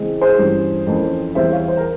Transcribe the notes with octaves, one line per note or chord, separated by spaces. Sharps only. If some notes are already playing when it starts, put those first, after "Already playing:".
Already playing: C#3 E3 G#3 C4
G#4 C5
G2 E3 G3 C#4
F2 E3 A#3 C#4
E2 E3 G3 C4 C5 E5
C#5 F5
C5
A#4